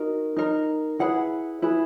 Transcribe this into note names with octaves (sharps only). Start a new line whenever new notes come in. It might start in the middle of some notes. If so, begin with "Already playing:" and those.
Already playing: D#4 F#4 A#4
D#4 A#4
E4 G#4 B4 F#5
E4 G#4 B4